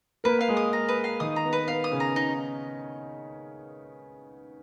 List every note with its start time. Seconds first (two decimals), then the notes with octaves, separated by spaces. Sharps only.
0.24 A#3 A#4 B4
0.41 F5
0.48 G#3 G#4
0.57 D#6
0.73 A#5
0.89 B4
1.04 F5
1.20 D#3 D#4 D#6
1.36 A#5
1.45 B3
1.53 B4
1.68 B3 F5
1.84 D#6
1.91 C#3 C#4
2.00 A#5
2.16 D#4